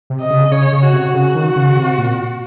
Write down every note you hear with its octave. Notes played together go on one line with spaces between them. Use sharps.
C3
D#5
C#3
C#3 C#5
C#3
F#4
C3
C#3 F#4
D#3
C#3
C3
A#2